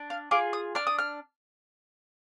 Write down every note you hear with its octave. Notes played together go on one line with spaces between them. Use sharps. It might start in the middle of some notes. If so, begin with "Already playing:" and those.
Already playing: D4
F5
F4 G#4 D6
D#6
D4 F6
D#6
F6